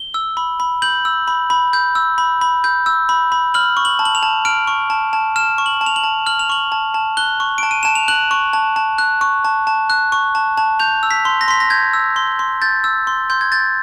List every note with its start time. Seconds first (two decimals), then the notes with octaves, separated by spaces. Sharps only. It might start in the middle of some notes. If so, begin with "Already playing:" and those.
Already playing: G7
0.14 E6
0.37 B5
0.60 B5
0.82 G6 F#7
1.05 E6
1.28 B5
1.50 B5
1.73 G6
1.95 E6
2.18 B5
2.41 B5
2.64 G6
2.86 E6
3.09 B5
3.32 B5
3.54 F6 F#7
3.77 C#6
3.85 F#7
3.99 A5
4.05 F#7
4.15 F7
4.23 A5
4.45 F6 D7
4.67 C#6
4.90 A5
5.13 A5
5.36 F6 E7
5.58 C#6
5.66 F#7
5.81 A5
5.86 F7
5.96 F#7
6.04 A5
6.26 F6 F#7
6.39 F7
6.49 C#6 F#7
6.72 A5
6.94 A5
7.17 F#6 G7
7.40 C#6
7.58 A5 D7
7.71 D#7
7.83 A5 E7
7.95 F7
8.08 F#6 F#7
8.31 C#6
8.53 A5
8.76 A5
8.98 F#6
9.21 C#6
9.45 A5
9.67 A5
9.90 F#6
10.12 C#6
10.35 A5
10.57 A5
10.79 G6 F7
11.03 E6
11.11 B6
11.25 C6
11.41 A#6
11.48 C6 B6
11.60 A#6
11.70 G6 G#6
11.93 E6
12.16 C6
12.39 C6
12.62 G6 A6
12.84 E6
13.07 C6
13.30 C6 G6
13.41 G#6
13.52 G6 A6